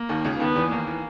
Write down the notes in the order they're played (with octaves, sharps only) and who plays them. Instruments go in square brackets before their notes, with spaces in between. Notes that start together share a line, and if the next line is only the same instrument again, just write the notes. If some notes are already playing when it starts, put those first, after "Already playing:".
Already playing: [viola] A#3
[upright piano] D#2 D#3
C#2 C#3
[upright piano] D#2 D#3 [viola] B3
[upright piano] E2 E3
[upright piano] D#2 D#3 [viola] A#3
[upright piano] E3